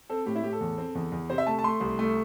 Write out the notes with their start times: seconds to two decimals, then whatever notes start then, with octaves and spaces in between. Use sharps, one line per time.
0.10 C4 A4
0.26 A2 G4
0.35 E4
0.43 A2 G4
0.53 A4
0.61 E2
0.78 C4
0.95 E2
1.12 E2
1.30 C3 C5
1.38 E5
1.46 A3 A5
1.59 A5
1.64 A3 C6
1.80 C2
1.99 A3